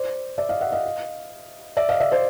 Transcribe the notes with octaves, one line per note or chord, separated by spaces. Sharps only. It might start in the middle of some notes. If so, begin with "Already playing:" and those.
Already playing: C5 D5
D5 E5
D#5 F5
E5 F#5
D#5 F5
D5 E5
D#5 F5
D5 E5
C5 D5